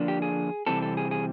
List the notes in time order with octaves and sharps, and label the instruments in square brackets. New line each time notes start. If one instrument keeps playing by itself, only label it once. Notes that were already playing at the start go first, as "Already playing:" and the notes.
Already playing: [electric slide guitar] D3 F3 A#3 D4
G4
G#4
C3 E3 G3 C4 A4
A4
G#4
G#4